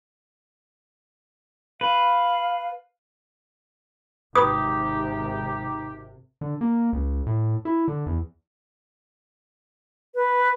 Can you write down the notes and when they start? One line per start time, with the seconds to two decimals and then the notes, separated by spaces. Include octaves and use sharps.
1.81 B4 F5
4.35 G#1 C3 D#3 D#4 G4 B4 D#6
6.41 D3
6.61 A#3
6.93 C#2
7.26 A2
7.65 E4
7.88 D3
8.06 E2
10.15 B4